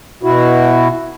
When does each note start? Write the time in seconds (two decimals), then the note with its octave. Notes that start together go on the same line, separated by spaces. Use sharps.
0.23 B2 E4 F#4